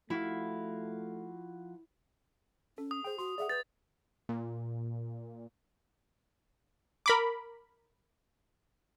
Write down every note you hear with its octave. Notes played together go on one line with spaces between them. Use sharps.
F3 A3 E4 F#4 F5
C#4 A4
D#6
G#4 C5 G5
F#4 C6
G#4 D5 E5 F#5
G#4 B4 G6 A6
A#2
A#4 B5 D6